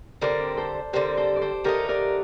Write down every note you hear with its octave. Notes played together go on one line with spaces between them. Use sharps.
D3 G3 C4 A#4 D5
A4 C5
D3 G3 C4 G4 A#4
A4 C5
D5
A4 C5
D3 A3 D#4 G4 A#4
A#4 D5